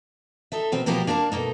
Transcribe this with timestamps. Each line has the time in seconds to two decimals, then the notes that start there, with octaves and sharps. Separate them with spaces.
0.52 D#4 A4 E5
0.72 B2 D#3 C4
0.86 B2 F3 A#3 B3 G4 A#4
1.07 A#3 D4 A#4 G5 A5
1.32 B2 A3 A#3 D#4